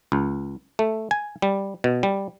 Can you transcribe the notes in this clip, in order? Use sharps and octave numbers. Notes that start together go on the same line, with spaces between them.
C#2
A3
G#5
G3
B2
G3